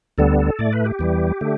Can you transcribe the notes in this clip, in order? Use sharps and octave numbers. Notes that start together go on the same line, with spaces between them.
D2 D3 G3 B3 A4
A4
A2 A3 D5
B4
G4
E2 E3 G3
D3 A3